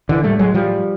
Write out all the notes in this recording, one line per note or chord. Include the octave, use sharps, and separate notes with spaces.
D3 E3
A2 G3 A3
F#3 G#3
F3 G3